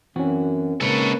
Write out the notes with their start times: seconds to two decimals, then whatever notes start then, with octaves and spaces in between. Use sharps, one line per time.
0.16 F#2 E3 C4 C#4 F#4
0.81 C#3 G#3 A#3 D#4 A4 B4 C#5